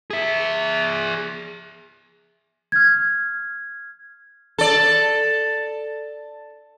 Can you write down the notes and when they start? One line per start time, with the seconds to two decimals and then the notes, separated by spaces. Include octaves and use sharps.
0.11 G#4 E5
2.72 F6 G#6
4.58 A4 D5